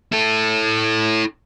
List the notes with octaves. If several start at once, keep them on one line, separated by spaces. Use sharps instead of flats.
E4 A4